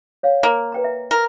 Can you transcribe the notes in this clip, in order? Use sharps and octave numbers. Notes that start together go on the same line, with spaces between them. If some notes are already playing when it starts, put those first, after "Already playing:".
C#5 F5
A#3
B4 G5 A#5
E5
A#4